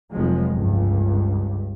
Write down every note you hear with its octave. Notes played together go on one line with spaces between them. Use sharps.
F1 F3 F#3 G#3
G1 C#2 G2